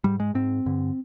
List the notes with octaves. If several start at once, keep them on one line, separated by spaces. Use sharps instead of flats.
G#2 G3
G#3
G#2 C4
G2 D3